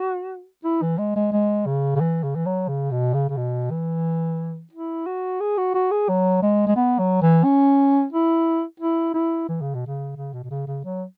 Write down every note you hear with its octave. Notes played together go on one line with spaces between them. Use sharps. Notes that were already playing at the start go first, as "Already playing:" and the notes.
Already playing: F#4
E4
E3
G#3
G#3
G#3
C#3
C#3
E3
C#3
E3
F#3
C#3
B2
C#3
C#3
B2
E3
E4
F#4
G#4
F#4
F#4
G#4
F#3
G#3
G#3
B3
F#3
E3
C#4
E4
E4
E4
E3
C#3
B2
C#3
C#3
B2
B2
C#3
C#3
F#3